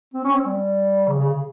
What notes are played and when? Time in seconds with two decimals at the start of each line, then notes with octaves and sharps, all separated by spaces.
0.14 C4
0.24 C#4
0.35 C4
0.46 G3
1.07 C#3
1.19 C#3
1.29 C#3